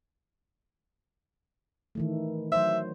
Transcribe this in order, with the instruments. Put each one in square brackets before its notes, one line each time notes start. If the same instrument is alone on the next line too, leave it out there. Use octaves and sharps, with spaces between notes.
[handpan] D#3 E3 A3
[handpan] F#3 C5 [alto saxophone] E5